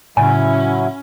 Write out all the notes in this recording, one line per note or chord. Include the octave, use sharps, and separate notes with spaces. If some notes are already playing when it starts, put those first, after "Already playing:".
A2 C#3 F#3 C#4 E4 G#5